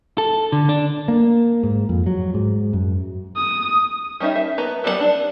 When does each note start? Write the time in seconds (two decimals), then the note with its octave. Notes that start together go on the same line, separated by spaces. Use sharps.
0.18 A4
0.52 D3
0.69 D4
1.08 A#3
1.63 G#2
1.89 F2
2.06 F#3
2.34 G#2
2.73 F#2
3.36 D#6
4.20 G3 C#4 D#4 E5
4.35 E5
4.58 B3 B4 A#5
4.84 F#3 G3 B3 D4 F#5
5.00 D4